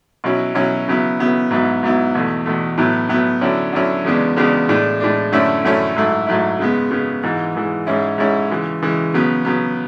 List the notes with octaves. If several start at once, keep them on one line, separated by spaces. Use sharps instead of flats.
B2 F#3 C#4 E4
B2 F#3 C#4 E4
C#3 F#3 B3 E4
C#3 F#3 B3 E4
G#2 F#3 B3 E4
G#2 F#3 B3 E4
E2 B2 A3
E2 B2 A3
A2 F#3 B3 E4
A2 F#3 B3 E4
D3 F#3 C#4 E4
D3 F#3 C#4 E4
E2 C#3 G#3 B3 D4
E2 C#3 G#3 B3 D4
A2 G#3 D4
A2 G#3 D4
F#2 D3 A3 C#4 E4
F#2 D3 A3 C#4 E4
G#2 F#3 A3 E4
G#2 F#3 A3 E4
C#3 G#3 B3
C#3 G#3 B3
G#2 E3 G#3
G#2 E3 G#3
G#2 G#3 C#4 E4
G#2 G#3 C#4 E4
C#3 E3 G#3
C#3 E3 G#3
C#3 F#3 B3
C#3 F#3 B3